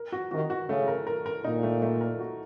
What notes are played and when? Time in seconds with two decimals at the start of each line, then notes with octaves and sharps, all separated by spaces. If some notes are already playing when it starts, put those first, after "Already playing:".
Already playing: A#4
0.12 F#4
0.31 C3 D#3 F#4
0.50 F#4
0.69 C#3 A3
0.88 A#4
1.07 A#4
1.26 A#4
1.44 A#2 D#4
1.63 A3
1.82 A3
2.01 A#4
2.20 F#4